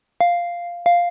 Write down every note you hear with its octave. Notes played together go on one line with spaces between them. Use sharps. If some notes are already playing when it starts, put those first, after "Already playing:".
F5
F5